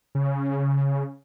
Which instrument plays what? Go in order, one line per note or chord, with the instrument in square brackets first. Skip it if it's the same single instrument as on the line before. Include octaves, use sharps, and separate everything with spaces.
[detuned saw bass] C#3